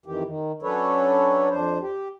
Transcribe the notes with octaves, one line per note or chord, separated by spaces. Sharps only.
F2 D#3 E3 G4
D#3
F#3 C#4 D4 A4 B4 C#5
F2 D4 C5
G4